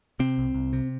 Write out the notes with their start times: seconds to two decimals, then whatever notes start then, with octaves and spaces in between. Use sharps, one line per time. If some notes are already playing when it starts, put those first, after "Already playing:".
0.19 C3 C4
0.38 C2
0.54 C2
0.73 C3